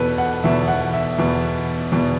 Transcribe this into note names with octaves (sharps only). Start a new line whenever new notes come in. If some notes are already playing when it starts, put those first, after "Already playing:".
Already playing: E2 B2 A4 B4
F#5
E2 B2 E5
F#5
E5
E2 B2
E2 B2